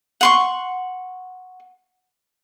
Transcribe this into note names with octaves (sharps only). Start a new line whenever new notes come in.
F#5 C6 C#6